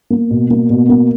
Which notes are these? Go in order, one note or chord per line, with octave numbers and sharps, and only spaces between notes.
A#3
B2
A#3
B2
A#3